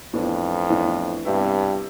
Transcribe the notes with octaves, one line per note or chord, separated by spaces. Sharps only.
F2 A2 E3 B3 D4
A2 E3 B3 D4
G2 C3 G3 B3 E4